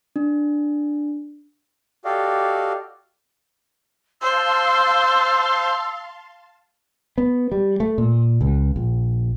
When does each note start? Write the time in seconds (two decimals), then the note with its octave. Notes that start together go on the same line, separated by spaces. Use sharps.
0.16 D4
2.05 F#4 G4 A4 D5 D#5 F5
4.21 C5 F5 A5 C6 E6
7.18 B3
7.52 G3
7.80 A3
7.98 A#2
8.41 C#2
8.76 A#1